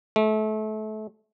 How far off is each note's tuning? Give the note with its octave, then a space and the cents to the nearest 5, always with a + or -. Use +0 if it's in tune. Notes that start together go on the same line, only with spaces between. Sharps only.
A3 -30